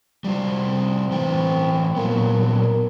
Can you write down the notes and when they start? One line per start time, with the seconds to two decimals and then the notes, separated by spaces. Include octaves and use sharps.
0.24 G3 F4 C5
0.67 C4
1.11 A2 E3 G5
1.96 A#2 F#3 A#3 B3
2.33 A#4